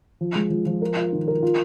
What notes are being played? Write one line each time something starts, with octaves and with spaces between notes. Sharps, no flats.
F3
G#3
F3
F3
A#4
F4
D#3
A#4
F4